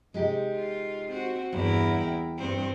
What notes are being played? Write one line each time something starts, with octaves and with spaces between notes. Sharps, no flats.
C3 G#3 D#4 G4
F4
C4 F#4
E2 G2 E4 A#4
G5
G2 C4